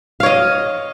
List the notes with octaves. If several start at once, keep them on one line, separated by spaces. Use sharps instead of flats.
C#5 D#5 F5